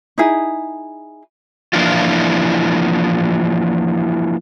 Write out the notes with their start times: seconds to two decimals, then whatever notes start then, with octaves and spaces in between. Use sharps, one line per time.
0.18 D#4 E4 G#4
1.73 E3 F3 A#3 D4 E4 F4